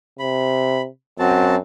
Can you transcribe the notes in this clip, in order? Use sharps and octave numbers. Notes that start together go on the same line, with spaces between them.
C3 B5
F#2 C4 F#4 A5